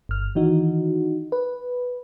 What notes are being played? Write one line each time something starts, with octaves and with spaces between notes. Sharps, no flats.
G1 F6
D#3 E3 D#4 F#4
B4